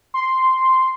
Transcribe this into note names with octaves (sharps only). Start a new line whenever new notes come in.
C6